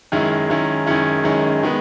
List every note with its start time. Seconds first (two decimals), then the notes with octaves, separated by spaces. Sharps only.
0.12 F#2 D#3 G#3 C#4 E4
0.49 F#2 D#3 G#3 C#4 E4
0.86 F#2 D#3 G#3 C#4 E4
1.24 F#2 D#3 G#3 C#4 E4
1.63 D#3 G#3 B3